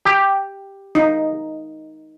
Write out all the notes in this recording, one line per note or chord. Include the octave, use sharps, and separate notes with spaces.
G4
D#4